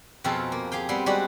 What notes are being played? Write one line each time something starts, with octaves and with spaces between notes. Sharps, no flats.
F2 B2 C4 F4 G#4 A4
A#3
G4 G#4 F5 G5
G3 B3 C4 C6
G3 G#3 C4 D4 F#4 G4